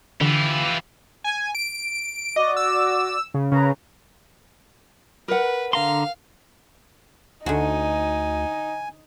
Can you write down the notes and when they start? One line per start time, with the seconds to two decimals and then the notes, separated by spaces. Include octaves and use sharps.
0.21 D3 E3 E4 F4 G4
1.24 G#5
1.55 D7
2.36 F#4 D5 D#5 D6
2.57 E6
3.34 C#3
3.52 C#3 A#4 B4 A#5
5.28 A#4 B4 F#5
5.73 D3 F5 A#5 C6
7.46 D2 D3 D#4 F#4 G#5